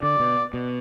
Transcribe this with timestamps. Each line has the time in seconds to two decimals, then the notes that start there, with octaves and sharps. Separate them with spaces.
0.03 D3 D5
0.20 B2
0.54 B2